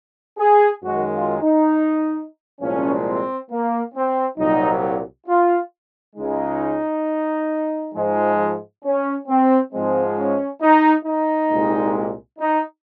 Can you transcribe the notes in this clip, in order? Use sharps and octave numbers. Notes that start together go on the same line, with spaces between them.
G#4
F#2 D#3 G#3 F#4
F4
D#4
C2 A#2 F3 G#3 C#4
C4
A#3
C4
C2 A#2 F#3 D#4
F4
C#2 C#3 G#3 D#4
G#2 F3 G#3
C#4
C4
G#2 F3 G#3 C4
C#4
D#4
D#4
C2 A#2 G#3
D#4